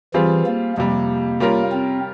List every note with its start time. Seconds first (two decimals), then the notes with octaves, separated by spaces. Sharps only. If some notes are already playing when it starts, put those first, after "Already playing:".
0.14 E3 G3 C4 F4 G#4
0.46 A#3
0.77 F2 C3 G3 A#3
1.40 G3 C#4 F4 A#4
1.72 C4